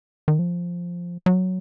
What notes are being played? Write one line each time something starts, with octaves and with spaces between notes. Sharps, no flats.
D#3
F3
F#3